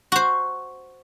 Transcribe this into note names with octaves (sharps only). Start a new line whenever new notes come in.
F#4 C5